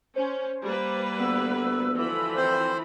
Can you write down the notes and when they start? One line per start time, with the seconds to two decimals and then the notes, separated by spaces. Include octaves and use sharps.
0.16 C#4 C5
0.63 G3 A#3 B4
1.20 D2 B3 E6
1.95 E3 F3 B5
2.37 C4 C5